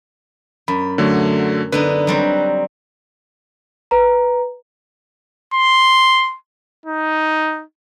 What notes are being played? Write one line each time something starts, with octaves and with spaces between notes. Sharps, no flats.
F#2 B5
D3 F#3 A3
D3 B3 D#4 B4
F#3 G3 C4
B4 A#5
C6
D#4